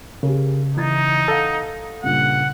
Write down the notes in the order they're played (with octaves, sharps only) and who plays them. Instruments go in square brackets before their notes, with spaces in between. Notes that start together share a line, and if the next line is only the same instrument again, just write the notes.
[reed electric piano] C#3 [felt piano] G4 G#4 A#4
[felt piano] E3 G#6 A6 [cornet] D#4
[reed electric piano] A4 F5 [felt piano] F#5
[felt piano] G2 A#2 C#3 [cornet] F#5